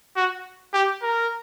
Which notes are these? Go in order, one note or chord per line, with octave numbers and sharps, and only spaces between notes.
F#4
G4
A#4